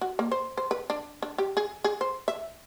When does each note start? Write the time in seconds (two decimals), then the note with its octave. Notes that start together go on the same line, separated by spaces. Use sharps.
0.01 F#4
0.19 A#3
0.32 C5
0.57 C5
0.71 B4
0.90 D4
1.22 D4
1.38 G4
1.57 G#4
1.84 G#4
2.01 C5
2.28 E5